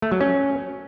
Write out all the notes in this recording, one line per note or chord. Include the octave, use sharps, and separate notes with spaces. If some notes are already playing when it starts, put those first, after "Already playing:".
A3
F#3
C#4